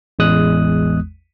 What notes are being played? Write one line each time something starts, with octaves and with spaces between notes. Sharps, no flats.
A1 E2 G#3 D#6 F#6